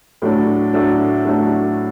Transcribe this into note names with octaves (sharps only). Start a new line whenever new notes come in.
A2 F#3 A3 D4 A4
A2 F#3 A3 D4 A4
A2 F#3 A3 D4 A4